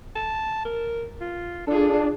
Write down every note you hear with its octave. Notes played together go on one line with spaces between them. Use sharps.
A5
A#4
F4
D4 F4 G#4 A4